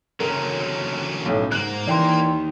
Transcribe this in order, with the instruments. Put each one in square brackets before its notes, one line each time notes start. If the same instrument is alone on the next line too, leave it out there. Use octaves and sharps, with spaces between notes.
[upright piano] F#1 A#4 [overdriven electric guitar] D3 C#4 [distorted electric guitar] F#3 A#3
[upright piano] B1 F#2 A2
[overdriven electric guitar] C2 G#2 [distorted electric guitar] A#3 [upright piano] F#6 F#7
[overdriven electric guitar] D#2 D#3 [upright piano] E3 [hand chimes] D5 G5 C6